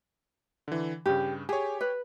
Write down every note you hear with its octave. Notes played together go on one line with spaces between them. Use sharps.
D3 E3
G2 C#3 G4
G4 G#4 C#5
B4